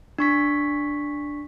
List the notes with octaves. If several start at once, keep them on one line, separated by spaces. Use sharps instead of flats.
D4 C#6 B6